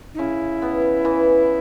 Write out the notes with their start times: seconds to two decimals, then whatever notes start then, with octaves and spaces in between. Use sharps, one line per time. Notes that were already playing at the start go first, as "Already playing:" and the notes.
0.14 D#4
0.18 C#3 E4
0.62 B3
1.05 E3